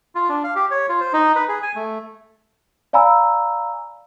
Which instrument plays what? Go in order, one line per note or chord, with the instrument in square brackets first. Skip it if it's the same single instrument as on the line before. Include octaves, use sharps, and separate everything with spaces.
[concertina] F4
D4
F5
G4
C#5
F4
C5
D#4
B4
G#4
G#5
A3
[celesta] D5 F5 G#5 A#5 B5 E6